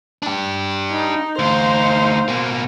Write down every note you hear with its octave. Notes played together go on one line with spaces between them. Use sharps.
D4 G4
D#4
D2 D#4 C5 F5
B2 A#3